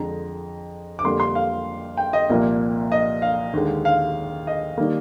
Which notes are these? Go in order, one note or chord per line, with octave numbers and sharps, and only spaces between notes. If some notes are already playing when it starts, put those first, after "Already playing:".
Already playing: F2 D3 G#3 A#5
D6
F2 D3 G3 A#3 C6
C6
F5
G5
D#5
C2 A#2 F3 A#3
D#5
F5
D#2 D3 G#3
F5
D#5
D#3 G3 A#3